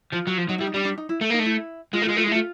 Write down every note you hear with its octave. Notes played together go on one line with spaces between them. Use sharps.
F3 F4
F#3
F3
F#3 D#4
G3 E4
D#4
G3 D4
D4
D#4
E4
A3
A#3 D#4
A3
E4
G#3 F4
A3
G#3 F4
A3 F4
G#3
E4
A3
F4